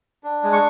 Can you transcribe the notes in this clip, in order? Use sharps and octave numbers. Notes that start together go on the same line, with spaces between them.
D4
G#3
C#6